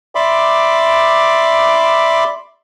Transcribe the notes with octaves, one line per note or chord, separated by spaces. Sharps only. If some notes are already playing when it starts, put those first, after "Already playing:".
D5 E5 B5 C6 D6